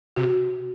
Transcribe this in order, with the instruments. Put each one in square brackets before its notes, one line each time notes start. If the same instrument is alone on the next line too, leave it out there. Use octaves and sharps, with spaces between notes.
[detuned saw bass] C3 [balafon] F#4